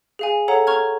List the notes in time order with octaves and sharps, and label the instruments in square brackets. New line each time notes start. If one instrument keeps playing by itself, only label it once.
[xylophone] G#4 F5 G#5
A4 C#5 F#5 A#5
A#5 C#6 F6 G#6